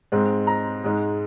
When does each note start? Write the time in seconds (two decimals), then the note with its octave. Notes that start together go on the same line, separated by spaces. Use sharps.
0.12 G#2 G#3 C4
0.47 A#5
0.84 G#2 G#3 D#4